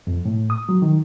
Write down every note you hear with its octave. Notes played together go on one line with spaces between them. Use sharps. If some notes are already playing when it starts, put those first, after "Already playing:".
F2
A2
D#6
F#3
D#3